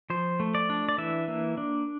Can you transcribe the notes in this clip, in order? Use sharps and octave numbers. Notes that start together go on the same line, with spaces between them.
F3 C5
A3
D5
D4
D5
E3 E5
A#3
D4